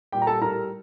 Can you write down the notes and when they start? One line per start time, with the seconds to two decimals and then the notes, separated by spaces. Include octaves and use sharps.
0.12 A#2 G3 G4 G5
0.22 A#5
0.27 A4 A5
0.41 A2 G3 A#4 A#5